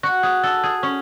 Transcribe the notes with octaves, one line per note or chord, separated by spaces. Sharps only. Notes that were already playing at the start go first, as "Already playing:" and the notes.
F#4
G#4
A4
G#4
C#4